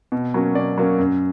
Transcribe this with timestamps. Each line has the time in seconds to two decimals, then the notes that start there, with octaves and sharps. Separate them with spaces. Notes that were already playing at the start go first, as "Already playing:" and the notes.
0.12 B2
0.34 F#3 A#3 C#4
0.55 B2 D5
0.78 F#3 A#3 C#4
0.99 F#2